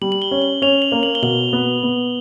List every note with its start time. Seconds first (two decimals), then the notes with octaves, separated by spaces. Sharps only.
0.01 G3 F#7
0.12 F#7
0.22 G7
0.31 C#4
0.42 F#7
0.62 C#4 F7
0.82 F#7
0.92 A#3
1.03 F#7
1.15 G7
1.22 B2 F#7
1.53 B3
1.83 B3